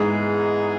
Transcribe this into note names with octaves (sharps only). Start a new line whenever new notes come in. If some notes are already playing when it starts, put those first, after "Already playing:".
Already playing: G#2 E3 B3 D#4 G#4